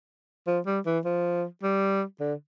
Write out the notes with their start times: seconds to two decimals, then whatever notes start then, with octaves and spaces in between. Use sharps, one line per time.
0.47 F3
0.66 G3
0.86 E3
1.05 F3
1.63 G3
2.20 D3